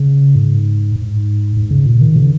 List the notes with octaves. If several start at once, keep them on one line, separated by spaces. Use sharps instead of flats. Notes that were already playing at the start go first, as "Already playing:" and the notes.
Already playing: C#3
G#2
G#2
G#2
C#3
A#2
D#3
C#3